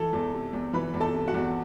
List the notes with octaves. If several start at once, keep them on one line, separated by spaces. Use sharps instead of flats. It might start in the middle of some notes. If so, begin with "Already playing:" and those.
Already playing: E3 A4 A5
E2
C3
E2
E3 B4 B5
E2
A4 A5
C3
F#4 F#5
E2